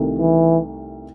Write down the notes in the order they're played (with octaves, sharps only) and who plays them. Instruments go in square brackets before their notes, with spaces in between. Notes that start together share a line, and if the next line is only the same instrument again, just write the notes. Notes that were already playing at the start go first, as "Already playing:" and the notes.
Already playing: [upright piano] C2 C3 D#3 A3
[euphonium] E3